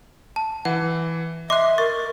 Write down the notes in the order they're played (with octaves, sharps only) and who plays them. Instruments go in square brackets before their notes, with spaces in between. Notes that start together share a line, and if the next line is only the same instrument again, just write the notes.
[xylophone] A5
[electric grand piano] E3 [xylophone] F#5
[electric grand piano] D#5 C6 [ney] E5 [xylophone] D6 F#6
[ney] A#4 [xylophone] C#6 [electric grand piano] A6